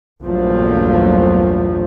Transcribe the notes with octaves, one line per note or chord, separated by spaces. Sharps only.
A#1 E2 G2 F3 F#3 A3